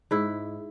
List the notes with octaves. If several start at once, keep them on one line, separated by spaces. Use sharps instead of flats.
G#2 E4